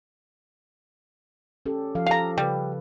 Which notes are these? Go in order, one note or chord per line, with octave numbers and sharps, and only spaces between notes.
C#4 G4 A4
F3 A4 F5
G4 A4 F5 A#5
C#3 G3 B4